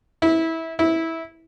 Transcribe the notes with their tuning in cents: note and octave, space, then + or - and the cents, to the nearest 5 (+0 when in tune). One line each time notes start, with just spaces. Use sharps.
E4 -20
E4 -15